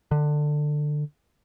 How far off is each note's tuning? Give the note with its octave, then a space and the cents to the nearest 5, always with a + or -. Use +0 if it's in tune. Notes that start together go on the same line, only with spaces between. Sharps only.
D3 +20